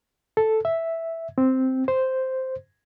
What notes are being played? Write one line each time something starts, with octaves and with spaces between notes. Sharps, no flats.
A4
E5
C4
C5